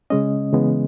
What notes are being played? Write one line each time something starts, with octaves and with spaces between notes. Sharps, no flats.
C#3 G#3 C#4 D#5
C#3 E3 G#3 B3